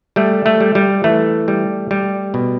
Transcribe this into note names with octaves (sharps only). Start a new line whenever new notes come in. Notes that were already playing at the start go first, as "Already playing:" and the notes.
G3 A3
A3
G3
G3
E3 A3
G3
G3
B2